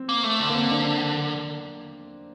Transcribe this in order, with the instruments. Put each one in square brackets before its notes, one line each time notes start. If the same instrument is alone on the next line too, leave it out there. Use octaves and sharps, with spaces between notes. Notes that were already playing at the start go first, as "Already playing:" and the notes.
Already playing: [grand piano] C4
[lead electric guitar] A#3
A3
D3
[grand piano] A#3
C4
D4